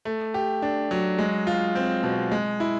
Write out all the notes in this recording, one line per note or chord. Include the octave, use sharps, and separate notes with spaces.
A3
G4
D4
F#3
G#3
F4
C4
B2
G#3
E4